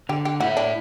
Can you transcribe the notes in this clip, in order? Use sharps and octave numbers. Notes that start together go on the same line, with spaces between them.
D3 G4
G4
A3 E4 F#4
D4